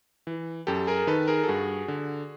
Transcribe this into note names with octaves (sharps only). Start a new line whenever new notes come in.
E3
F#2 G4 A4
G#4 A#4
D#3 A4 B4
G#4 A#4
A4
G2 F#4 G#4
D3